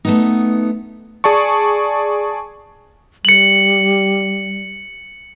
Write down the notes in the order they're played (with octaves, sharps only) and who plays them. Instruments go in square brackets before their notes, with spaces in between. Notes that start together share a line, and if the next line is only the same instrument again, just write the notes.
[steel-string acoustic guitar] A3 B3 D#4
[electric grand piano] G#4 D5 A5 C#6
[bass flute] G3 [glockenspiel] C#7 F#7